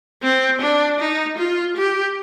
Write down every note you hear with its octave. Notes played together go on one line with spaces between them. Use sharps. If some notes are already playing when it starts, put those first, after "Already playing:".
C4
D4
D#4
F4
G4